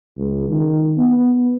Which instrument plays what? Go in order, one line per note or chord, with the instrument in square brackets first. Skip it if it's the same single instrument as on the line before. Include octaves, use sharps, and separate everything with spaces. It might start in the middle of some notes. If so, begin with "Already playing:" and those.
[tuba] C#2
D#3
B3